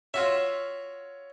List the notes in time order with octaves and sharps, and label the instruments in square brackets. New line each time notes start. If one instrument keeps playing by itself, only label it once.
[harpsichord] F4 F#4 E5 [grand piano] C#5